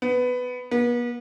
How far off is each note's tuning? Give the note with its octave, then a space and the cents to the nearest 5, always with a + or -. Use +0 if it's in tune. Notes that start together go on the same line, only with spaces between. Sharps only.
B3 +10
B3 -40